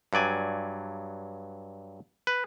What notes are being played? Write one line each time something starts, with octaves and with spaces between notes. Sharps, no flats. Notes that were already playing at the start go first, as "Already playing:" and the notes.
G2 F#3 D5 G#5
B4